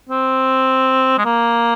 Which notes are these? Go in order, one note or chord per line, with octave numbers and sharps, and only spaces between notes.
C4
G#3
A#3